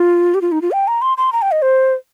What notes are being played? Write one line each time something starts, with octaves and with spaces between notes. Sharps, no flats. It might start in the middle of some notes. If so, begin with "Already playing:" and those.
Already playing: F4
G4
F4
D#4
F4
G5
A#5
C6
C6
A#5
G5
D#5
C5